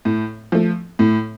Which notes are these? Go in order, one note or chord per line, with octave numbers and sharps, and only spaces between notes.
A2
F3 A3
A2